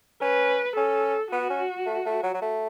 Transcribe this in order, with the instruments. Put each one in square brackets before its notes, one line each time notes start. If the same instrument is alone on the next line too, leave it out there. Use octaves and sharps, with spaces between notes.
[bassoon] C#4 [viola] B4
[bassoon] C#4 [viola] A4
[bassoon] B3 [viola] F#4
[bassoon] C#4
A3
A3
F#3
F#3
A3